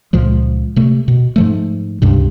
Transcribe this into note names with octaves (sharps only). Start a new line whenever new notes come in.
C#2 A#2 F3 G#3
C3 A3
B2
G#2 F3 A3
C#2 G2 C3